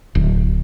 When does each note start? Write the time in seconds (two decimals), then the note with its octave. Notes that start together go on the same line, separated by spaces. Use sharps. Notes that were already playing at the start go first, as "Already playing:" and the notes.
0.15 D1